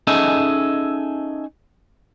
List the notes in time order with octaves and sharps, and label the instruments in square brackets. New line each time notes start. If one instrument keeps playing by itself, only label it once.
[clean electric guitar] C#4 D#4 G#4 A4 D#5 E5